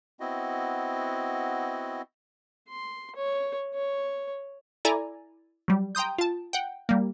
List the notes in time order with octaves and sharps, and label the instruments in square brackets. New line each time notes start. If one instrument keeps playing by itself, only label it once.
[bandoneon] B3 C4 E4 F#4 D#5
[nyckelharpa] C6
C#5
C#5
[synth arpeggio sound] E4 A4 D5 G#5 A#5
F#3 G3
G5 A#5 C6 D#6 G6
F4 A5
F#5 G5
G3 A#3